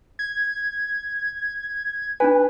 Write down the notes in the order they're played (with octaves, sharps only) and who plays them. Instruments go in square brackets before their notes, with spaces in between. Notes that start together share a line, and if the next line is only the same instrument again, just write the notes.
[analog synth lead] G#6
[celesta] D4 D#4 G#5 [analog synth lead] B4